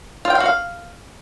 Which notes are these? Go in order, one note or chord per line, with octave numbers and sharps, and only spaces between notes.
F4
G5
F5
F#4
F5